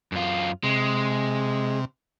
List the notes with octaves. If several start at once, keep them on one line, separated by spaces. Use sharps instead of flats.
F#2 F4
C3 G#3